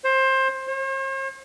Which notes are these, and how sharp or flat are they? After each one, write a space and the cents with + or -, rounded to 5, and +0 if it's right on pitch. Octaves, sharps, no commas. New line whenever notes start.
C5 +20
C5 +45